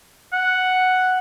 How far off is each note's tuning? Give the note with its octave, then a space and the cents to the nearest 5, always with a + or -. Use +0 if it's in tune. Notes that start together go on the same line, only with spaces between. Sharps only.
F#5 +0